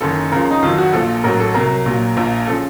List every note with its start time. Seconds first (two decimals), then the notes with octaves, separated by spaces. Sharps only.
0.01 F#1 F#2 D#3 A4
0.32 C#2 C#3 F3 A#4
0.51 D#4
0.62 F2 D#3 F#3 F4
0.78 F#4
0.93 A#1 A#2 F3 A4
1.24 A1 A2 F#3 A#4
1.40 A4
1.54 C2 C3 F#3 A#4
1.86 A#1 A#2 F#3
2.16 A#1 A#2 F3
2.47 C#3 F3 A4